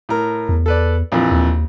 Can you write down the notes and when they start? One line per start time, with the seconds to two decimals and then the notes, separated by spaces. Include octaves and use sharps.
0.09 A2 A#4
0.49 E2
0.66 A4 B4 D5
1.12 A#1 F2 E3
1.32 D#2